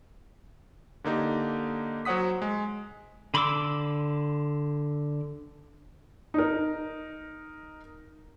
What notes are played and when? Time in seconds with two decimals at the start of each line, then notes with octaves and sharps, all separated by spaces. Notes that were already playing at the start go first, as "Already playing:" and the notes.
1.04 D3 A#3 D#4 G4
2.05 F#3 C5 C#5 F#5 D#6 B6
2.42 G#3
3.34 D3 B5 C6 D6 E6
6.34 D#4 A#4